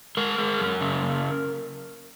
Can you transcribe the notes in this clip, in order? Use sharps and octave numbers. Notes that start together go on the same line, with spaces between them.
G#3 A#4
G#3
F#2
C#3
A#3